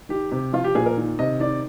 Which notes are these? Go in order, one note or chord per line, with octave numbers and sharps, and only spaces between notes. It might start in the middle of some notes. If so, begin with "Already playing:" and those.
D#3 G4
C3 G4
F3 F4
G4
A#2 G#4
A#4
D#3
C3 D#5
D#3 D5